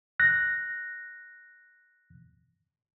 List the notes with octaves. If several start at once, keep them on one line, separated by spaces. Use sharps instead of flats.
F#6 A#6